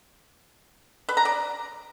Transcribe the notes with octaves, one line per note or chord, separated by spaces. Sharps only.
B4
A#5
D5